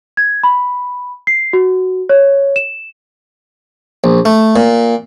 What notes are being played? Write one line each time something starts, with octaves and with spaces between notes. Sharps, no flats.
G#6
B5
C7
F#4
C#5
E7
A#1
A3
A#2